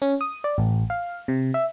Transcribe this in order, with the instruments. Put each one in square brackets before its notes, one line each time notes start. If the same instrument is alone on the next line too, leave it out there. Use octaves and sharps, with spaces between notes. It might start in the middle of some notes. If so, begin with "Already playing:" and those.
[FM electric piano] C#4
D#6
D5
A1
F5
C3
E5